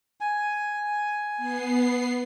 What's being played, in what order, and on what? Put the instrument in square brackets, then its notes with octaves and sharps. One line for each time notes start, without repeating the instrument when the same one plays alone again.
[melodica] G#5
[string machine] B3 C7